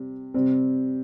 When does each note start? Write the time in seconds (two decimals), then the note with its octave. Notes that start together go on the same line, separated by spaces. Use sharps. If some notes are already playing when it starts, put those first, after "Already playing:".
Already playing: C3 G3
0.34 C3 G3 C4